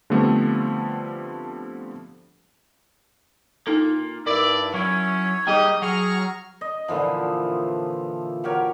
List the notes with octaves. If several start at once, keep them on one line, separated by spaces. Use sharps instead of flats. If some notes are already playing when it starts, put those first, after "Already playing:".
D3 F3 G3 A3 B3 C4
A#3 D4 D#4 F4 A4
G2 E4 A#4 D5 E6
F#3 C#4 E4 C#5
G3 A#3 D#4 G4 G#4 D#5 G5
F#3 G#4 F#5 A#5 C#6 F6
D#5
A#2 D3 E3 F3
F#4 G4 A#4 C#5